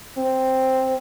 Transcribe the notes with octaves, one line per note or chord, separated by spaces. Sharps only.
C4